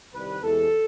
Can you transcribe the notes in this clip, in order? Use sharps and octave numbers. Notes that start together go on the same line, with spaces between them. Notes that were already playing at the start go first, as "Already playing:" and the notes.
C2 C3 D#3 G3 B4
E2 C3 E3 G#3 A4